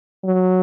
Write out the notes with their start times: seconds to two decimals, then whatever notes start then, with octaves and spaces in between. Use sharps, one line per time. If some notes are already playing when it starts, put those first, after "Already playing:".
0.24 F#3